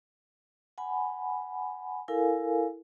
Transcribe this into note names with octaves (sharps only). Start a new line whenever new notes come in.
F#5 G#5 B5
E4 A4 A#4 F5 G#5